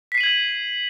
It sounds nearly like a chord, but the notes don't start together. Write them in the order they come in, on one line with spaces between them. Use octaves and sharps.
B6 C7 D#7 F#7 G#6